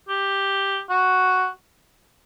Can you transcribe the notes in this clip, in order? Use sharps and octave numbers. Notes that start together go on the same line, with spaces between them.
G4
F#4